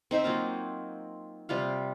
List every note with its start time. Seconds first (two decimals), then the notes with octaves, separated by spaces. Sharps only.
0.11 C4 D#4 C5 E5
0.24 F#3 A#3 F4 F5
1.49 C3 G3 F4 F5